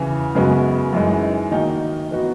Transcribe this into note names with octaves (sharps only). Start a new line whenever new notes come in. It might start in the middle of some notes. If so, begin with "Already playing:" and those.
Already playing: E2 C#3 E3
F#2 C#3 G#3 B3 F#4
F#2 E3 G#3 D#4
D#3 A#3 D#4 F#4
E3 B3 D#4 F#4